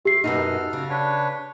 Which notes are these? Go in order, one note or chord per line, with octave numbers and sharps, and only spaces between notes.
G4 E5 C7
F#2 B2 D#4 F#4 A4 F6
C#3
D4 B4 C#5